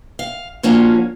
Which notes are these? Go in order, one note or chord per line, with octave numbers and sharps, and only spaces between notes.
F5
F3 A#3 C#4 D4 F4 F#4